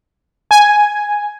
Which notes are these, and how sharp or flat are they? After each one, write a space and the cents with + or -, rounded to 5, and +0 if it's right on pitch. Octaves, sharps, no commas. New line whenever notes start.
G#5 +0